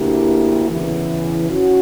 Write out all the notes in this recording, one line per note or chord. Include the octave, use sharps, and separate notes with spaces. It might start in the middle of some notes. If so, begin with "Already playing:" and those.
Already playing: D2 D3 A#3 E4 G4
E2 C#3 E3
C#4 F#4